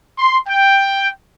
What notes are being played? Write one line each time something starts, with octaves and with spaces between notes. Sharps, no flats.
C6
G5